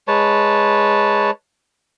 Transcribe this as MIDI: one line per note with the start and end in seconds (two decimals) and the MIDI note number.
0.08 1.31 56
0.08 1.31 71
0.08 1.31 73
0.08 1.31 81